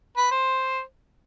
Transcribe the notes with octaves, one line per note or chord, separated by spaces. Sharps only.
B4
C5